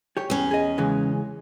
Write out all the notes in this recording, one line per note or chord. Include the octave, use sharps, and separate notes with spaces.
G4 C#5
E2 C#4
G#4 D#5
C#3 E3 G#3